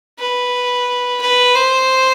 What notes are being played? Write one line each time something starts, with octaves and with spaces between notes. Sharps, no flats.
B4
B4
C5